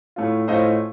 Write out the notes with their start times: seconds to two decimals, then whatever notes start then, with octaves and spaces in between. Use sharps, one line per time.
0.16 A2 A3 C#4 F4
0.48 A2 A3 C#4 F4 C5 D#5